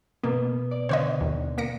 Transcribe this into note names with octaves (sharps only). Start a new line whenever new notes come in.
B2 A#3 B3
D5
D3 C5 C#5 D#5
D#2
A#3 A#6 C#7